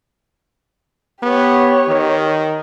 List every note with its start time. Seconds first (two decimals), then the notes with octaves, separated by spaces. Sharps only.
1.23 B3 G4 C#5
1.89 D#3